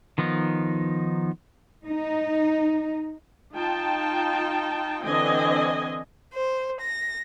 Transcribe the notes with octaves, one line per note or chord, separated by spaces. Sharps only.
D#3 F3 B3 D#4
D#4
D#4 F4 G5 A5
D3 E3 C4 D4 D#5 G#5
C5
A#6